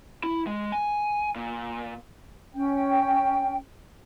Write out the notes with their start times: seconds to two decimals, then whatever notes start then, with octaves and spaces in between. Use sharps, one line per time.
0.24 E4
0.47 G#3
0.72 G#5
1.35 A#2
2.55 C#4 G5